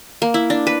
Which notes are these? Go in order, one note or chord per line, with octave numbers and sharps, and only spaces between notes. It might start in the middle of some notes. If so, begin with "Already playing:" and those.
A#3
E4
D4
B4